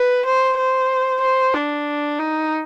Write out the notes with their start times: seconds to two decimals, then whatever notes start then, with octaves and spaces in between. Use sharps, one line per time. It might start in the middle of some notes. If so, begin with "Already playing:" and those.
Already playing: B4
0.26 C5
0.58 C5
1.21 C5
1.54 D4
2.19 D#4